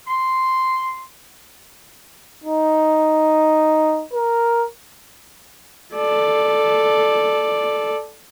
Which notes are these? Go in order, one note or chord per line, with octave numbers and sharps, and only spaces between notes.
C6
D#4
A#4
A4 D5